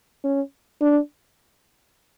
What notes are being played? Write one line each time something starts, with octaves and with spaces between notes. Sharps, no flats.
C#4
D4